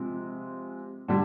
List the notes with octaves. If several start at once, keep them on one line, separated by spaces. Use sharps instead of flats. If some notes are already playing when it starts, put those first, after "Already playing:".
Already playing: C3 F3 G#3
D3 G3